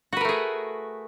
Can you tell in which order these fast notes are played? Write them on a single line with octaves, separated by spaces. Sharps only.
F#4 B4 A#4 A3 G#4